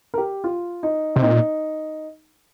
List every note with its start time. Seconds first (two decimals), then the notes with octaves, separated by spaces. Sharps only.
0.14 A#4
0.18 G4
0.44 F4
0.83 D#4
1.16 C3 C4
1.22 A#2 D#4